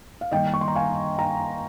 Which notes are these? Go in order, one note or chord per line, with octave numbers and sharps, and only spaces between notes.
F5
D#3 G3 A#3 D#5 G5
C#6
C6
A#5
F5 G#5
G5 A#5